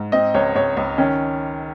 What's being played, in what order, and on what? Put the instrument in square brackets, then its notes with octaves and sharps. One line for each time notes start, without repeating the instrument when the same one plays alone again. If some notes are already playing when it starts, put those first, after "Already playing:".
Already playing: [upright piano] G#2
[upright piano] C4 [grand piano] D#5
[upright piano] C#2 [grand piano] C#5
[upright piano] C#2 [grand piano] C#5
[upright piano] C#2
[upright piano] D#3 [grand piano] C#4